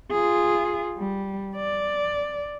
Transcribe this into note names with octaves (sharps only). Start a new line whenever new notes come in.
F4 G#4
G3
D5